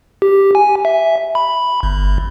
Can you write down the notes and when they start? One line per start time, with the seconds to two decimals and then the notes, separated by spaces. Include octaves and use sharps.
0.22 G4
0.55 G#5
0.85 E5
1.35 B5
1.83 G1